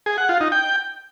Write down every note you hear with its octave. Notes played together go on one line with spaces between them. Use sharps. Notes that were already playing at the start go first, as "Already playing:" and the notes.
G#4
F#5
F4
D#4
G5